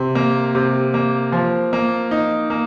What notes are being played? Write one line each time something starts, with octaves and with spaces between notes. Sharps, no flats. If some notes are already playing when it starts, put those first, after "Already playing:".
Already playing: C3
A#3
C3
A#3
F3
A#3
D#4
A#3